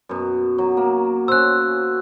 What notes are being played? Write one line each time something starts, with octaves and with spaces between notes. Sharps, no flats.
F#2 B2
F#3
A#3
C#4 C5 E6 F#6